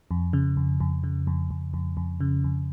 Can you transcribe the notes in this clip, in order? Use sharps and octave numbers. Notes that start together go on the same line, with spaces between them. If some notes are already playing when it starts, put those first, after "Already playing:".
F2
C#3
F2
F2
C#3
F2
F2
F2
F2
C#3
F2